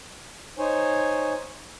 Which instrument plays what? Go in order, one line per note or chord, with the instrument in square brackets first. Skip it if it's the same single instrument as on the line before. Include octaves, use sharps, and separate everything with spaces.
[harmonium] D#4 C5 C#5 G#5